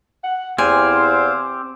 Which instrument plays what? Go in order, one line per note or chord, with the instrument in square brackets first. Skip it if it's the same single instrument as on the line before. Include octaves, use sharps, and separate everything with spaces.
[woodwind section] F#5
[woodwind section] E2 [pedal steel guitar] C4 G4 [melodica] C5 F5 [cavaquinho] G#5